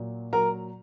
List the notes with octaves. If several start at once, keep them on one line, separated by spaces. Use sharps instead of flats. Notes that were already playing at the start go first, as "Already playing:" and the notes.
Already playing: A#2 F#3
F#3 A#4 A#5